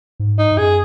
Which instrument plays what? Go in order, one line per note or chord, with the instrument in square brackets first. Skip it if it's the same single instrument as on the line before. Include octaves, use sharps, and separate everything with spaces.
[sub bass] G#2
[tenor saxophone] D#4
[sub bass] G#2
[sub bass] F#2 [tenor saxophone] G#4